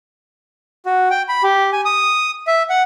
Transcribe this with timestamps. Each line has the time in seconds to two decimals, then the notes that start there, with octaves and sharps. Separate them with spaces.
0.86 F#4
1.10 G5
1.29 B5
1.43 G4
1.73 G#5
1.85 D#6
2.47 E5
2.70 F#5